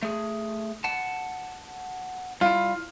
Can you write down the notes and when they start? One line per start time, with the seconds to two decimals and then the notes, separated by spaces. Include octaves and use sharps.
0.03 A3 G#4
0.84 F#5 A5
2.41 G3 E4 F4